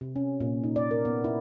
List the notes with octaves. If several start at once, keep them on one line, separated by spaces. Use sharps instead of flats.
C3
C#4
A#2
D#4
D5
A#4
B3
E4